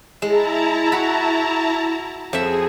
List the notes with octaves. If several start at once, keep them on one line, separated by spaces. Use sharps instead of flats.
G#3 E4 A5 A#5
F#4 B5
F2 G#4 E5